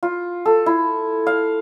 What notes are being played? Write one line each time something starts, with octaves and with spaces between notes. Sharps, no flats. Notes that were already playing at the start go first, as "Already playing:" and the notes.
F4
A4
E4
F5